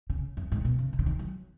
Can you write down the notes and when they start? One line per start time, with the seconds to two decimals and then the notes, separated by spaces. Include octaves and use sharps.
0.10 C#3
0.37 F#2
0.52 G#2
0.65 B2
0.79 C#3
0.93 D#3
0.99 C#3
1.06 D#3
1.19 F#3